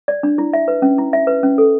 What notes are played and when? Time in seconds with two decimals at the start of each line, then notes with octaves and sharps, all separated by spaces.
0.08 D5
0.23 D4
0.38 E4
0.53 E5
0.68 B4
0.82 C#4
0.98 E4
1.13 E5
1.27 B4
1.43 C#4
1.58 A4